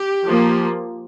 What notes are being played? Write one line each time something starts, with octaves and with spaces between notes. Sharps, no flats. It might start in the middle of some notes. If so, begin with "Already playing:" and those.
Already playing: G4
F3 A#3